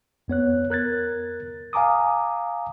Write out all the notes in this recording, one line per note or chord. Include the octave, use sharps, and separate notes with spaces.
F2 B3 C#5 F#6
A#4 F#6 G#6 A6
F5 G#5 A#5 D6 D#6